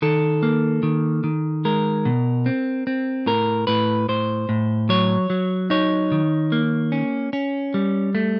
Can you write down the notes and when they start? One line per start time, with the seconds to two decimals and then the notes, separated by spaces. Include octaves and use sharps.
0.02 D#3 A4
0.43 A#3
0.83 D#3
1.24 D#3
1.65 G#3 A#4
2.05 B2
2.46 C4
2.87 C4
3.26 A2 A#4
3.67 A2 B4
4.09 A2 C5
4.49 A2
4.89 F#3 C#5
5.30 F#3
5.70 D#4 C#5
6.12 D#3
6.52 A#3
6.92 C#4
7.33 C#4
7.74 G3
8.15 A3